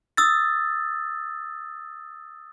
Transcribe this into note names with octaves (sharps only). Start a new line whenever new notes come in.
D#6 E6 A6